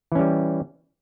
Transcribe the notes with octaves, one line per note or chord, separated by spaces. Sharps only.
E3 G3 C#4